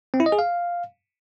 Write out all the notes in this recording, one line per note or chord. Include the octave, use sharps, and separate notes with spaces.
C4
E4
D#5
G#4
F5